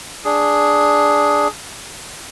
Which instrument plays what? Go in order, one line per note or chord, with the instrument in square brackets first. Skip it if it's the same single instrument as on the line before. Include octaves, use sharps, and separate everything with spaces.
[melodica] D4 G#4